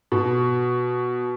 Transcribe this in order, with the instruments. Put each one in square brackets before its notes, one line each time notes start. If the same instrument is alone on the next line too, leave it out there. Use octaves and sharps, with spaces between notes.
[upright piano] B2